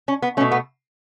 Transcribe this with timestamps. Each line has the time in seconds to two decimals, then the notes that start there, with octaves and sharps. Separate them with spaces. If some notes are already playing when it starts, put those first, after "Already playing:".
0.08 C#4
0.22 B3
0.37 A3 C#4
0.40 B2
0.52 B3